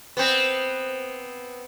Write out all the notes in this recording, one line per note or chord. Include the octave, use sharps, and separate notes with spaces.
B3 C4